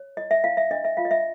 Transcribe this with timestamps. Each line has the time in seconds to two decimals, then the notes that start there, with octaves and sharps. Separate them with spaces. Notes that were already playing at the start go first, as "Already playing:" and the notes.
Already playing: C#5
0.17 E4 D#5
0.31 E5
0.44 E4 F5
0.57 E5
0.71 D4 D#5
0.84 E5
0.97 F4 F5
1.05 D#5
1.11 E5